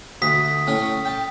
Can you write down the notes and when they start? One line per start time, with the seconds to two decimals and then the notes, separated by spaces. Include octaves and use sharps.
0.22 D2 D#6 B6
0.67 A2 C#4
1.05 G5 A5